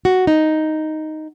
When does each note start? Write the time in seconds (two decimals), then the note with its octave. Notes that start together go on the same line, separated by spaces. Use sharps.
0.05 F#4
0.27 D#4